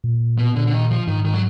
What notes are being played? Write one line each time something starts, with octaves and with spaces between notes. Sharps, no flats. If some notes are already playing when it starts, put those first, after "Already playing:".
A#2
B2
D3
D3
D#3
F3
G#2 D#3
D#3
F#3